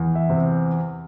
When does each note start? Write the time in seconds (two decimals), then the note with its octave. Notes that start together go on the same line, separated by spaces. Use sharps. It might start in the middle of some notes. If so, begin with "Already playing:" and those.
Already playing: E2
0.15 E5
0.30 C3